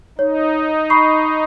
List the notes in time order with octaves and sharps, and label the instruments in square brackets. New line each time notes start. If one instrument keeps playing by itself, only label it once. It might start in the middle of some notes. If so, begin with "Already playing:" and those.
[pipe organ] D#4 [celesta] C#5
[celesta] B5 C#6 C7